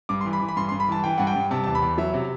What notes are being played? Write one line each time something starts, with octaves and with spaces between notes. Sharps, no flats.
G2 D6
C6
E3
B5
E3
B5
G2 C6
G2 C6
B5
E3 A5
E3 G5
G2 F#5
G5
G2
C3 A5
E2 A5
B5
E2
F#3 E5
C3